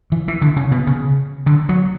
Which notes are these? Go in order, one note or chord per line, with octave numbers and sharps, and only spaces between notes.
E3
E3
D3
C#3
B2
C#3
D3
F#3